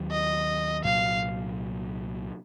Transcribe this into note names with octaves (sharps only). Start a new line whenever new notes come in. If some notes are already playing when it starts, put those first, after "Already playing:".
Already playing: D#2 D#3 F#3
D#5
C2 A#2 F#3 F5